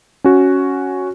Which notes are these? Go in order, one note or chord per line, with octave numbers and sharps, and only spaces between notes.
C#4 F#4